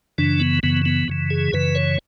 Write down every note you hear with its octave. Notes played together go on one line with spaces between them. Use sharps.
F#2 C#3 E3 D4
B3
F#2 C#3 E3 B3
B3
F#2 C#3 E3
G#4
F#2 C#3 E3 B4
C#5